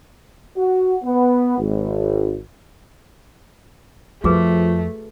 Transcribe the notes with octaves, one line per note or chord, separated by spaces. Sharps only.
F#4
B3
G#1
F2 F3 A3 F#4 G#4 B4